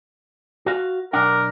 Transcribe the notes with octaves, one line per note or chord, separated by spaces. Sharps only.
F#4 F5
B1 D4 A#4 F#5